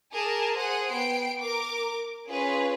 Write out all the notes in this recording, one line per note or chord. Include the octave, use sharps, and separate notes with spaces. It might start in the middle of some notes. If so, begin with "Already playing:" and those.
G#4 A#4 A5 D6
G#4 C5 F#5 F#6
B3 G5 C7 D7
A#4 D6
C#4 F4 G#4 B4